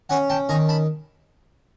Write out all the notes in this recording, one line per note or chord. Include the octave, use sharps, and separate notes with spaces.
C#4 F#5 G#5
G5 A5
D#3 G#5 A#5
A5 B5